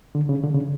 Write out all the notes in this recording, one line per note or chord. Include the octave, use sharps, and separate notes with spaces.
D3
C#3
D3
C#3